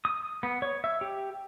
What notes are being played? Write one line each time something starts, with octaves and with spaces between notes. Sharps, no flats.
D#6
B3
C#5
E5
G4